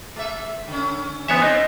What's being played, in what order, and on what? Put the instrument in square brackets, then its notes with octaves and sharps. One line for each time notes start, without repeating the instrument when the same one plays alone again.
[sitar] G#3 E5
D3 C#4
[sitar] E3 G#3 D4 [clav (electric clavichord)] B3 C#5 E5 [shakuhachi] G#5
[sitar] C3 C4 [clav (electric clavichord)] D#4 [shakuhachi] D#5